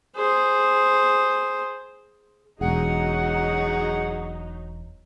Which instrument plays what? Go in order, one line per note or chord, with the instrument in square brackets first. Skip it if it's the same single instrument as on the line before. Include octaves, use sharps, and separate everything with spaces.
[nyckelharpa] G#4 C5
[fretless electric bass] E1 [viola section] F#3 D#4 [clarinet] G#4 [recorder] F#5